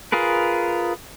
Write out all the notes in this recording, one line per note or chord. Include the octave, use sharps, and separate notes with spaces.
F4 G#4 A#4 B4